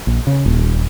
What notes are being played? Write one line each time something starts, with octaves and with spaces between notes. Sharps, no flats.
A#1
C#3
D#1